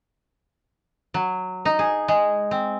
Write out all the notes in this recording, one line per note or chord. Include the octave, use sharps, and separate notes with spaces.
F#3
D#4
G#4
G#3
C4